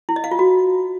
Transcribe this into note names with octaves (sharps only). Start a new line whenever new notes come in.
E4
D#5
F5
F4
F#4